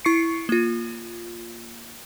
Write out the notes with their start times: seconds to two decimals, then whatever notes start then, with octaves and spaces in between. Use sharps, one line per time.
0.05 E4 C#6 C7 C#7
0.49 A#3 F4